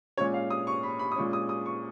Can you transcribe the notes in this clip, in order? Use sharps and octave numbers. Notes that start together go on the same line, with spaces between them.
A#2 G#3 C#4 C#5
F5
D#6
C#6
B5
B5
D#6
A#2 G#3 C#4 C#6
D#6
D#6
C#6